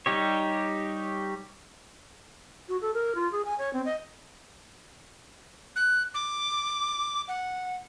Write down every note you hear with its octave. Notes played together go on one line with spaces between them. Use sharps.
G3 D#4 G4 C#5
F#4
A4
A#4
F4
G#4
G#5
C#5
C4
D#5
F#6
D6
F#5